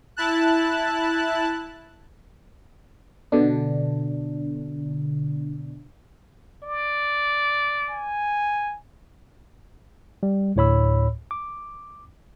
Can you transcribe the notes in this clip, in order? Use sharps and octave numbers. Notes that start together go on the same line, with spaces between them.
E4 A5 F#6
B2 D3 D4
D5
G#5
G3
D2 A2 C#5 B5 E6
D6